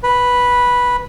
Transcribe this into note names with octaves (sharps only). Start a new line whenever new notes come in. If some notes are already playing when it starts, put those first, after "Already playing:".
B4